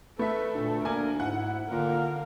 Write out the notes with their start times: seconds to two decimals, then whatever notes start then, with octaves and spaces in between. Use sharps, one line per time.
0.19 A3 A4 B4 E5
0.55 D2 A#2
0.85 A#3 D4 A#4 G#5
1.20 G#2 E4 F#5
1.71 A#2 D3 A#4 F5